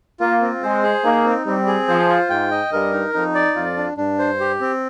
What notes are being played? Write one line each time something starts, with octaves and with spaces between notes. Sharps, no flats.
A#3 F4
C4
G#3 C5
G#4
A#3 D#4
C4
G3 C4
G#4
F3 C5
F4
G#2 G5
D#5
G2 A#4
D#4
F2 D#4
D5
F2 F4
D4
G2 D4
C5
G4
C4